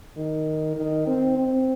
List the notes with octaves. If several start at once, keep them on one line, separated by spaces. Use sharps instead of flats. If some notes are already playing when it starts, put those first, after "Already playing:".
D#3
D#3
C4
C4